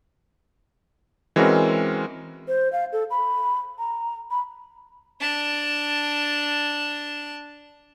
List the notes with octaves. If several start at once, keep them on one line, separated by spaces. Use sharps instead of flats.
E3 G#3 C4 C#4 F#4 A#4
C5
F5
A4
B5
A#5
B5
D4 A5